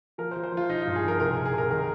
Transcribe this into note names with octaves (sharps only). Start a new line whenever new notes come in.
F3 A#4
C5
F3
C5
F3
F4
F3 D#4
F4
G2
G#4
F3 A#4
C2 A#4
G#4
C2
G#4
C2 A#4
D#3 A#4